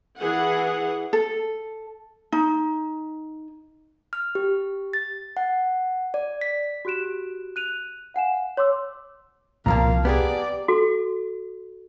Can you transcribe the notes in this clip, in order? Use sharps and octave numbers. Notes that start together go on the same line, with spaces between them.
E3 G#4 F#5
A4
D#4
F6
G4
A6
F#5
D5
B6
F#4 G4 F#6 D7 E7
F#6 D#7 F7
F5 F#5 G#5 E7
C#5 C6 D6 E6
C2 A#2 F3 A#3 F5 A5 A#5
B3 G4 G#4 D5
F#4 A4